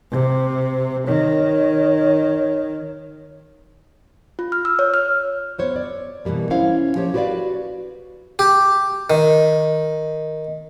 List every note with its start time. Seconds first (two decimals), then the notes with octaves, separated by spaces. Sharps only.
0.11 C3
1.07 D#3 C#5
4.39 F4
4.52 F6
4.65 E6
4.79 C#5
4.94 F6
5.58 B3 C5 C#5
5.76 D5
6.25 B2 E3 F3 G3 A#3
6.50 C#4 E4 C5 F5
6.95 F3 A#3 G4 C5 C#5
7.14 F#4 G4 B4 C5 D5 F5
8.39 G4
9.10 D#3